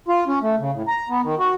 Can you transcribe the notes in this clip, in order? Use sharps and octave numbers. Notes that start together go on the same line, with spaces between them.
F4
C#4
A3
C#3
A2
A#5
B3
D#3
F#4